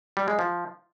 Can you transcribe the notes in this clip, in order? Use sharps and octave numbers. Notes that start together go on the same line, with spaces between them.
G3
G#3
F3